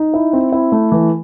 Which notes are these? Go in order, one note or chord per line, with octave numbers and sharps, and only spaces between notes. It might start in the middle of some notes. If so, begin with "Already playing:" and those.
Already playing: D#4
E4
C4
E4
A3
E3